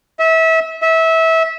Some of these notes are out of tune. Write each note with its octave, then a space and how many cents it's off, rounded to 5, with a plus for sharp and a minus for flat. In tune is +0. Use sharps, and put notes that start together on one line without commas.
E5 -25
E5 -20